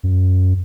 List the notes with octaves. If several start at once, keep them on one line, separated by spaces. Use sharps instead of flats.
F#2